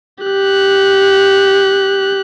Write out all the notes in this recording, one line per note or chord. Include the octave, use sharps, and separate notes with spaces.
G4 F#6